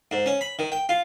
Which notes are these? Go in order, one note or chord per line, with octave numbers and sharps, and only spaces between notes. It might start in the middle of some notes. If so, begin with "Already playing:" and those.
G#2
C#4
B5
D#3
G5
F4